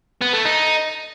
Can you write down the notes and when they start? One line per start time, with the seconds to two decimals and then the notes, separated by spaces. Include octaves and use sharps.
0.22 B3
0.33 A3
0.45 D#4